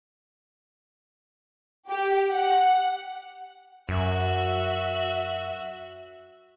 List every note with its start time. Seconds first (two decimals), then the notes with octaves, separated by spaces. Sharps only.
1.89 G4
2.32 F#5
3.89 F#2 F#4 E5